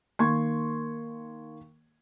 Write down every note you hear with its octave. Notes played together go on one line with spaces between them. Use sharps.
D#3 A#3 C6 C#6 G#6